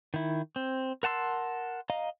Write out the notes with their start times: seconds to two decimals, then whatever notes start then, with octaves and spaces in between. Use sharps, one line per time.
0.14 D#3 E4
0.56 C4
1.03 A#4 F#5 A5 C6 E6
1.90 D#5 F5 A#5